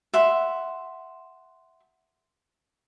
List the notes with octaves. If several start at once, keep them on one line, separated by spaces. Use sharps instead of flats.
E5 F#5 C6